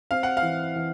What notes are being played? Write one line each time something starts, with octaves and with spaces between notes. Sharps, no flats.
C4 F5
F#5
F5
E3
E3